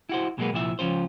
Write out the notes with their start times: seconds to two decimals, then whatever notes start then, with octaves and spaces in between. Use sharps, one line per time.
0.09 E4 F#4 C5
0.38 B2 F#3 G#3 A#3 B3
0.53 C2 A#2 F3 E4 F4 E5
0.79 C#2 F3 C#4 F4 C5